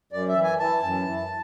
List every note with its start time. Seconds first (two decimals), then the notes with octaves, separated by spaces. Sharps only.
0.12 F#2 D5
0.28 E5
0.35 E3
0.43 G#5
0.59 E3 A5
0.83 F#2
1.06 E3